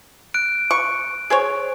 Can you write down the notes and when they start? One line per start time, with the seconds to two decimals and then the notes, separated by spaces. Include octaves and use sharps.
0.34 F#6 D7
0.71 C#6
1.30 G#4 C5 C#5